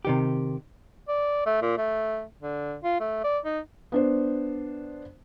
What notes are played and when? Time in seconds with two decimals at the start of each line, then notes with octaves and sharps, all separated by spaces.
0.05 C3 D#3 G4
1.08 D5
1.46 A3
1.62 A#2
1.78 A3
2.42 D3
2.84 F4
3.00 A3
3.24 D5
3.45 D#4
3.92 B3 D4 C5